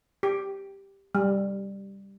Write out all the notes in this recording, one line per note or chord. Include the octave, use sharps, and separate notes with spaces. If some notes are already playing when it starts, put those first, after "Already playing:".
G4
G3